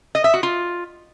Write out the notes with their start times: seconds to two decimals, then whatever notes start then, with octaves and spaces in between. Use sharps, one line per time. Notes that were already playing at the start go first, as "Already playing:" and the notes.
0.15 D#5
0.24 E5
0.34 F#4
0.43 F4